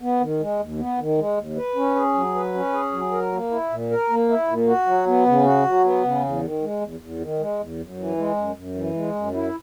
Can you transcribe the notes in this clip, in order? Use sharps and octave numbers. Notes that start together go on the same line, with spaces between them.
B3
D#3
G#3
D#2
B3
D#3
G#3
D#2
B4
C#4
G#4
F#3
B4
C#4
G#4
F#3
A#4
A#3
E4
A#2
A#4
A#3
E4
A#2
F#4
F#3
B3
C#3
F#4
F#3
B3
C#3
E2
D#3
G#3
E2
E2
D#3
G#3
E2
F#2
E3
G#3
F#2
F#2
E3
G#3
F#2
E4